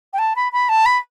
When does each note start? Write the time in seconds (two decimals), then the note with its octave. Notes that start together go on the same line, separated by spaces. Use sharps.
0.13 G5
0.18 A5
0.36 B5
0.52 B5
0.69 A5
0.86 B5